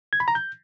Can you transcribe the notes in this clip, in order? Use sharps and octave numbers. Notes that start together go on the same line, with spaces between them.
G#6
B5
A#5
G6